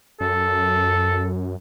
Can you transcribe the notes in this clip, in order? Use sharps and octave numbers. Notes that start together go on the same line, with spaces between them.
F#2 A4